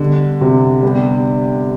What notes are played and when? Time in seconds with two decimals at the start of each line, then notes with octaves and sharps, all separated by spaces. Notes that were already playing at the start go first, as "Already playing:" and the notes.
Already playing: B2 D3 G3 D4
0.41 C3
0.82 G3 B3 D4 G4